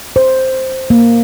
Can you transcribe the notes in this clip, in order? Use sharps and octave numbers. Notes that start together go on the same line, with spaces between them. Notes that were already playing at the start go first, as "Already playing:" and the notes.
C5
A#3